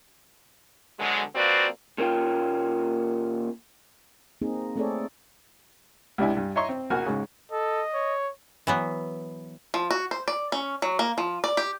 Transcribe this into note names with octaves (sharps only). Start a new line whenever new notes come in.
B2 D3 F#3 G#3
F3 A#3 C4 F#4 B4 D5
A#2 A#3 C#4 F4 G5
A#3 C4 D#4 G#4
A3 C4 G#4 A4 C#5 D5
C#2 C3 D4 E4 G#5
G2
C#5 D#5 E5 A#5 C6 C#6
C4
A#1 A#3 F#4 G#5 F6
G#2 C#3
A4 D#5
C#5
E3 F#3 B3
F3
F#4
C5
D5
C#4
F#3
A#3
F3
D5
G4